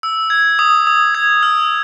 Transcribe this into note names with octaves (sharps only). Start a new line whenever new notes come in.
E6
G#6
D#6
D#6
G#6
F6